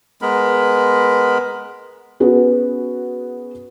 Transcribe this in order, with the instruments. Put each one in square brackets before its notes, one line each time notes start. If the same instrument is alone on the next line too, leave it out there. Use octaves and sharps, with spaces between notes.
[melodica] G#3 B3 A#4 B5
[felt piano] B3 C#4 F#4 G#4 B4